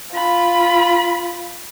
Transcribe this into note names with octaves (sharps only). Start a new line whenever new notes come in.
F4 B5